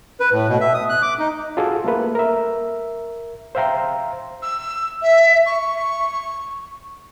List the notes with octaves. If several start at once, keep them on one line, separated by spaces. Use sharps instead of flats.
B4
A2
B2
E5
D#6
F#6
D6
D#4
F4 F#4 G#4 A4
A3 A#3 B4
A#4 E5
C5 E5 F5 G5 A#5 C6
E6
E5
C#6